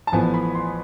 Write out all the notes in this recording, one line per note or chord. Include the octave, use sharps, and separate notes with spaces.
A5
A1 A2 F3 B3 G#5
B5
C6